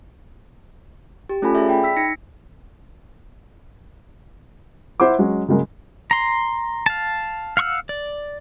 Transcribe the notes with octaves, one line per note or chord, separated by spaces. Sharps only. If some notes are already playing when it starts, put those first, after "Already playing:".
G4
A3 C#4 F4 A4 G#5 B5
G#4 D5 E5
G5 B5
E6 B6
D#4 A#6 C#7
E4 C5 F#5 D6
F#3 G#3 C#4
C#3 F#3 G#3 A#3
A#5 C6
F5 A5
F5 F#5 C#6 E6 F6
D5